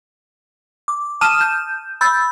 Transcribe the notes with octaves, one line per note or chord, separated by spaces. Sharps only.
D6
A5 D#6 F6 D#7 E7
G6
B5 E6 G6 A6